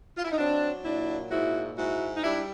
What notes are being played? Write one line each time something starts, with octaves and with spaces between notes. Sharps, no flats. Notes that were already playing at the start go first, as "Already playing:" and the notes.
F4
E4
D#4
F#3 C4 D4
A#2 D4 E4
G#2 E4 F#4
G#2 E4 F#4
D#4
G3 D4 E4